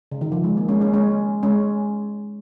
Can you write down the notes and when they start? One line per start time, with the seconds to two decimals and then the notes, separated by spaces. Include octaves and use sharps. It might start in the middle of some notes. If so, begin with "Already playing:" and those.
0.11 C#3
0.21 D#3
0.32 F3
0.44 G#3
0.57 A#3
0.68 G#3 C#4
0.81 G#3 C#4
0.93 G#3 C#4
1.43 G#3 C#4